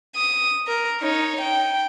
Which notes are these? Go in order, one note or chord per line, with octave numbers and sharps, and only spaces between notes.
D#6
A#4
D#4 C#5
G5